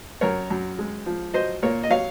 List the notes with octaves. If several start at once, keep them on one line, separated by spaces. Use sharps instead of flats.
F#2 A#4 C#5
F#2
G#3
F3
F#3 C5 D#5
A#2 A#4 C#5
D#5
F#3 C#5 F5